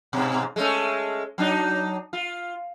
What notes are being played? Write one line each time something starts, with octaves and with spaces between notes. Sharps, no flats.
G#2 B2
G#3 A3 C#4
F#3 D4 D#4
F4